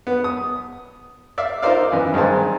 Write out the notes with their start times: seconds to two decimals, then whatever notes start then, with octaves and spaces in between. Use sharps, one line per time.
0.07 B3
0.24 D#6
1.38 D5 E5 F5
1.62 D#4 F4 A#4 C5 D5 F5
1.92 F#2 E3
2.14 G2 D#3 G#3 C4 A5